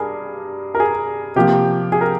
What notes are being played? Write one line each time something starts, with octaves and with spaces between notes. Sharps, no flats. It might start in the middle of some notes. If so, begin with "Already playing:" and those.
Already playing: G2 G#4 A#4
A#4
G#4
C3 F3 A#3 G4
G#4
A#4